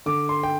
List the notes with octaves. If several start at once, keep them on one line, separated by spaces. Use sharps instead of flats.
D3 D6
C6
G5